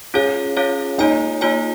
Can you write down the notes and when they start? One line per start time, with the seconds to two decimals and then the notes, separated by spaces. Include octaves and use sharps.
0.14 C#4 F4 G#4 C#5 F5
0.57 C#4 F4 C#5 F5
0.98 A#3 D#4 F4 C#5 G#5
1.41 A#3 F4 C#5 G#5